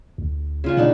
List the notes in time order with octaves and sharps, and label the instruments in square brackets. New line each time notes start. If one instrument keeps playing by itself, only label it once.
[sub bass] D2
[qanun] C#3 F4 C#6
[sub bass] A#2 [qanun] D4 D#4 F#5